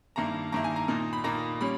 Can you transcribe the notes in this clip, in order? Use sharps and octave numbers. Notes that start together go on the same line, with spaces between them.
G2 D#3 A#3 E4 A#5
G2 D#3 A#3 E4 A#5
G#5
A#5
A#2 A#3 D#4
B5
A#2 A#3 D#4 A#5
G3 A#3 C#4 B5